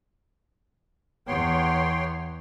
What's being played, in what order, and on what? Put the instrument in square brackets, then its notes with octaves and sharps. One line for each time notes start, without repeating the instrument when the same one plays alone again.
[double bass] E2 B3 [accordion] C#5 G5 C6